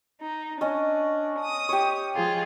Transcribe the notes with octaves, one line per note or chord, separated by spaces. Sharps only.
D#4
C#4 D4 D#5
D#6
G4 C#5
F3 F4 G#4